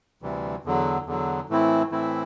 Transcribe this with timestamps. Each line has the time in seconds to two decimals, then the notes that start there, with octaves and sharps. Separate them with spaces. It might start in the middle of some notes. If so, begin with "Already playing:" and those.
0.22 D2 C3 E3 G3
0.64 E2 D3 F#3
1.06 E2 D3 F#3
1.49 A2 E3 A3 C4 E4
1.91 A2 E3 A3 C4 E4